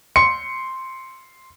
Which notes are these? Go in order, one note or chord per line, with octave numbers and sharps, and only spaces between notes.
C6 C#7